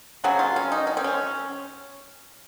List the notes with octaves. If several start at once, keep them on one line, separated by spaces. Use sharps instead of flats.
C#3 F#3 C4 F#4
F4
C#4
D#4
C#4
C4
C#4